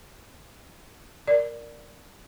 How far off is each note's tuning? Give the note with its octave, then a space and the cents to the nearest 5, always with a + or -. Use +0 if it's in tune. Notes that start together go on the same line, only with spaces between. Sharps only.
A#4 +0 D5 +0